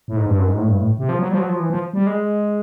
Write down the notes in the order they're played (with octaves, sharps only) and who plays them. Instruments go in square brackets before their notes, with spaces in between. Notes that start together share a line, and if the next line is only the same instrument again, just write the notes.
[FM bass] A2
G#2
G2
F#2
G#2
A2
G2
A2
C3
F3
F#3
G3
F3
F#3
F3
E3
F3
G3
G#3